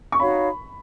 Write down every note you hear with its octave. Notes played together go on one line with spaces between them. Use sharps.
C#6
D#4 F#4 C#5 F5 B5